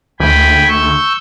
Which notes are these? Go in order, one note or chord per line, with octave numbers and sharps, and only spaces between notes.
D2 G5 G#5 B5
C#6 E6 G6